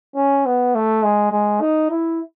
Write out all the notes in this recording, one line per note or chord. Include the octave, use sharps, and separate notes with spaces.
C#4
B3
A3
G#3
G#3
D#4
E4